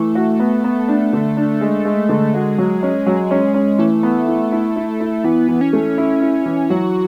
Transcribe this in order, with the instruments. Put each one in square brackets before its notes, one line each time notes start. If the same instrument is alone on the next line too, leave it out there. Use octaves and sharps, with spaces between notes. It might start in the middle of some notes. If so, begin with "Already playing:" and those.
Already playing: [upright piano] E3 [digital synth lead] A3
[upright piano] F#4
B3
B3
D4
D3
D4
G#3
G#3
D3
[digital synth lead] G#3 [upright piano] F#4
[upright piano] F#3
C#4
F#3
C#4
C#4
[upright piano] E3 [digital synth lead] A3
[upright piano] B3
E4
E4
E4
E4
[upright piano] E3 [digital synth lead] B3
[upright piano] E3
[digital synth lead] C#4
[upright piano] A3
E4
E4
E3
[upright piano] F#3 [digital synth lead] F#4